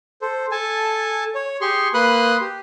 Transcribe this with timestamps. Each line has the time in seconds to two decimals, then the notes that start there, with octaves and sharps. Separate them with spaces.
0.22 A4 C5
0.51 A4 G#5 A5
1.35 C#5
1.61 G4 G#4 C6 C#6
1.94 A#3 B4 B5 C6 D#6 F#6
2.41 G4